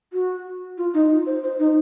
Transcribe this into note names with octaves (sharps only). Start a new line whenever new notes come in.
F#4
F4
D#4
F4
C5
C5
D#4